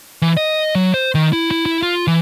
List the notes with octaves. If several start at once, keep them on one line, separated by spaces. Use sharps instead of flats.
E3
D#5
F#3
C5
D#3
E4
E4
E4
F4
E3